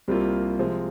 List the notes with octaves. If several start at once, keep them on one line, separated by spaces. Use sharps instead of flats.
C2 C3 G3 A#3 F4
C3 F3 G#3